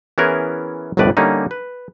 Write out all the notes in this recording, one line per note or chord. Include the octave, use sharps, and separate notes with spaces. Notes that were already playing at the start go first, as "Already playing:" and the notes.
E3 B3 C#4 E4 G#4 A#4
G1 C2 F2 A2 B4 D5
D3 G3 A#3 C#4 D#4
B4